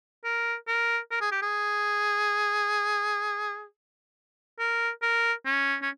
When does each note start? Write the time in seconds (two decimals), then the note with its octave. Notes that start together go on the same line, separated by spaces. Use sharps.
0.24 A#4
0.68 A#4
1.11 A#4
1.21 G#4
1.32 G4
1.42 G#4
4.59 A#4
5.02 A#4
5.46 C#4
5.82 C#4